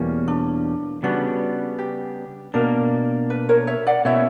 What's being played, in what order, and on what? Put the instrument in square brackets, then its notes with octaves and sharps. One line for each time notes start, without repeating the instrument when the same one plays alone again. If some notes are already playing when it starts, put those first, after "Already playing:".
Already playing: [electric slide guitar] E2 B2 G3 A#3 C#4
[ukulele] D4
[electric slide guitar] C#3 G3 B3 D4 [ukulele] F#4
[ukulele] G4
[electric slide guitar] B2 A#3 D4 [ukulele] A#4
[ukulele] B4
A#4 C#5
C#5 E5
D5 F#5
[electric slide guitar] B2 A#3 C#4 E4 [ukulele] C#5 E5